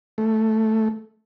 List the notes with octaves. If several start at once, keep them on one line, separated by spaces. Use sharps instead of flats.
A3